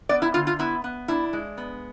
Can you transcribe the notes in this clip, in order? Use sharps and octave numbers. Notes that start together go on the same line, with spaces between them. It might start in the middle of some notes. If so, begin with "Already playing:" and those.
B3 D5
E4
D3 F4
F4
B3 E4
B3
D4 E4
G#3
B3